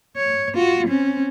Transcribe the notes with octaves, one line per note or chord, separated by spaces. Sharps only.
C#5
F4 F#4
C4 C#4